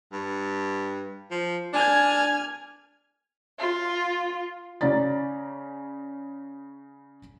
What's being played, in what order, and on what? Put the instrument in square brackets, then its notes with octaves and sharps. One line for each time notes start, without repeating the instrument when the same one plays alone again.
[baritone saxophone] G2
F3
[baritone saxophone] D4 [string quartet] G#5 F6 G#6
[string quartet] F4
[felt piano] C#3 C#4 D5 A#5 A6